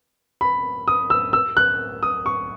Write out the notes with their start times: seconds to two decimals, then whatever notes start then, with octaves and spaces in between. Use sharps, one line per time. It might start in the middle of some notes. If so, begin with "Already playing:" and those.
0.41 B5
0.88 D#6
1.10 E6
1.33 E6
1.57 F#6
2.03 D#6
2.26 C#6